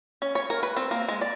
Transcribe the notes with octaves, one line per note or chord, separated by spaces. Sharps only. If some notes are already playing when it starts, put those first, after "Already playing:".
C#4
C#5
A#4
B4
C4
A#3
G#3
D5